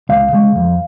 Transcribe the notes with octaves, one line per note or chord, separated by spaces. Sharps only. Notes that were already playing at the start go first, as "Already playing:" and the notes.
C#2 F5
C#3 G#3
F2